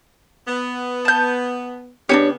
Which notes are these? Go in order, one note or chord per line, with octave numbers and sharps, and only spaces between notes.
B3
A5 G6
C#3 B3 D4 D#4 G4 C#5